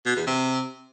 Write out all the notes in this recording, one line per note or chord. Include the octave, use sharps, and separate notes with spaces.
B2
E2
C3